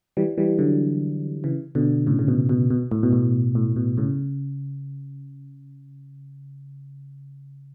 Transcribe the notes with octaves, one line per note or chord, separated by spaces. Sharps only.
E3 G3
E3 G3
D3 F#3
C#3 E3
B2 D3
A2 C#3
C#3
B2
B2
B2
A2
B2
A2
A2
B2
A2 C#3